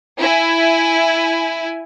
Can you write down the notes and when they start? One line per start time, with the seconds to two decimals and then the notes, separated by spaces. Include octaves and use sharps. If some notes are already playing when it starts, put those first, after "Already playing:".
0.20 E4 G#5